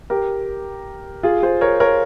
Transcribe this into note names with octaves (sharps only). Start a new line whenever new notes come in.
G4 A#4
F4 G#4
G#4 C5
A#4 C#5
A#4 C#5